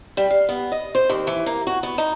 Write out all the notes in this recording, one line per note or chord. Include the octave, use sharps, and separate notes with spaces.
G3
F5
B3
D#5
C5
D#2
E3
A#3
F#4
B3
D#4